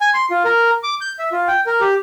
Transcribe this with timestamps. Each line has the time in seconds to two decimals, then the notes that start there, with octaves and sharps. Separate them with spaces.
0.01 G#5
0.14 C6
0.31 F4
0.45 A#4
0.83 D6
1.01 G6
1.19 E5
1.32 F4
1.48 G5
1.66 A#4
1.81 G4